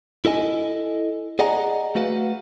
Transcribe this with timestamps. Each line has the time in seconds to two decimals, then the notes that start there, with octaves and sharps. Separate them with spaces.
0.25 E4 A4 D#5 G#5
1.39 G#4 D5 D#5 F#5 G#5 A#5
1.95 A3 F#4 B4 F5 F#5